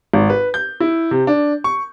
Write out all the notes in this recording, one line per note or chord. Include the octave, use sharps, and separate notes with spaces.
G#1
B4
G6
E4
C3
D4
C#6